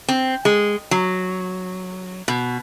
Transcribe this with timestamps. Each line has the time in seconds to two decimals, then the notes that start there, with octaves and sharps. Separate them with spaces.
0.08 C4
0.45 G#3
0.91 F#3
2.28 B2